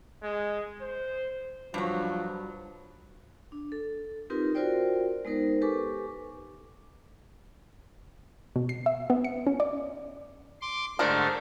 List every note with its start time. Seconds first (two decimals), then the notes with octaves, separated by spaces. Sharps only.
0.23 G#3
0.82 C5
1.74 G2 F3 F#3
3.52 D4
3.72 A4
4.30 C4 D#4 F4 G4 A#4 B4
4.55 F4 F#4 A#4 C5 D5 G5
5.25 G#3 B3 D#4 A#4 C5
5.61 G4 A4 B4 G#5 C#6 D6
8.56 B2
8.69 C7
8.86 E5
9.10 B3
9.24 C#7
9.47 C#4
9.60 D5
10.62 C6 D6
10.99 G#2 D3 A3 D4 A#4 C5